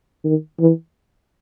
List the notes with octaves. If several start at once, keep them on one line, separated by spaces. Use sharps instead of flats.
D#3
E3